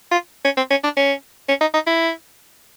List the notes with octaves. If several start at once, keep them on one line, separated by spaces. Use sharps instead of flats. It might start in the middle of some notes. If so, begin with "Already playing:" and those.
F4
C#4
C4
C#4
D4
C#4
C#4
D#4
D#4
E4